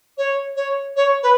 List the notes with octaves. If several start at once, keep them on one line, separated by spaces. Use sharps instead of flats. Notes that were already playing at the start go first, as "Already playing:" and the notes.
C#5
C#5
C#5
B4